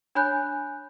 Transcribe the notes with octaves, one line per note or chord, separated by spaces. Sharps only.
D4 C#5 G#5 B5 F#6 G6